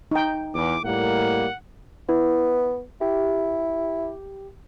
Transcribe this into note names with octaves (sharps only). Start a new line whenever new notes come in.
D#4 G5
E2 D6
A2 G3 A#3 F#5
B3 E4
E4 G4